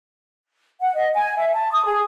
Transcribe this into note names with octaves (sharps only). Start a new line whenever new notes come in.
F#5
D#5
G#5
E5
A5
D#6
G#4